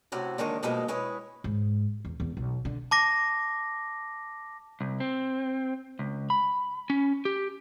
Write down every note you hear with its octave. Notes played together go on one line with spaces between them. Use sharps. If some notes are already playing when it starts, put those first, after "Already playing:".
A2 C3 C4 C#4 F#4
A#2 D3 D#3 G#3 A#3 C#5
G2 B2 F3 G#3 A#3 D#4
G#3 E4 G#4 B4 C#5
G#2
E2
E2 B3
B1
D3
A5 D6 A#6
C2
C4
C#2
B5
C#4
G4